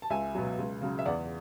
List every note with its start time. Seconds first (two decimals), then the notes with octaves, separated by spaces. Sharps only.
0.02 A5
0.10 C#2 E5 G#5
0.35 B2 F#3
0.59 C#2
0.81 C#3 F#3
0.99 E5
1.06 E2 D5 F#5